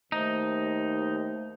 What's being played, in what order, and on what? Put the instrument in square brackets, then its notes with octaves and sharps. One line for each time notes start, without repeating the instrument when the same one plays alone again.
[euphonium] D#2 [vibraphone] A3 C5 E5 [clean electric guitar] D#4